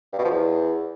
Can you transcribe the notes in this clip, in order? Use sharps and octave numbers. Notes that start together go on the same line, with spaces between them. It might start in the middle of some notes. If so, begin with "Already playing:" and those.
G2
B2
F3
E2